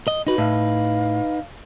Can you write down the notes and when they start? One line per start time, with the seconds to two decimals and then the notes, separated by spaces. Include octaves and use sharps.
0.08 D#5
0.27 D#4 F#4 B4
0.38 A2 F5